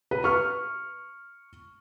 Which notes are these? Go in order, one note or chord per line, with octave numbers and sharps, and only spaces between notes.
B4
C#6 F6